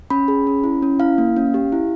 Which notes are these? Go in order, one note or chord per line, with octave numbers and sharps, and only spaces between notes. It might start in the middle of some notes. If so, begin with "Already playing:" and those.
C#4 B5
G#4
C#4
E4
C#4
E4 F5
A#3
C#4
G4
E4